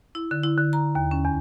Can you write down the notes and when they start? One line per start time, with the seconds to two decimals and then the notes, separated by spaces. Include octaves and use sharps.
0.15 E4
0.31 D3
0.43 E4
0.58 D3
0.73 A#5
0.95 D#2
1.11 C#4
1.25 E2